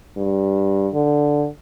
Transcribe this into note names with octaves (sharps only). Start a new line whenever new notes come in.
G2
D3